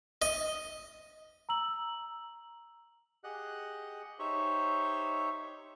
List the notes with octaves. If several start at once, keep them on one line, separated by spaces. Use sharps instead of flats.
D#5
A#5 E6 F#7
G4 G#4 D#5 F#5 F#6
D#4 G4 C5 C#5 E5 C#6